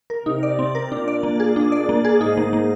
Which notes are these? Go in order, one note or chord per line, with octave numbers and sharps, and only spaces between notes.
A#4
C3 D#4
D5
C4
A#4
A#2 D4
D5
A#3
G#4
D4
D5
A#3
G#4
G#2 D#4
A#3
A#3